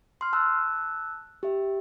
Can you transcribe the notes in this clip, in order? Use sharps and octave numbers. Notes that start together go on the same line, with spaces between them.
C6 F6
A5 E6 F#6
G4 E5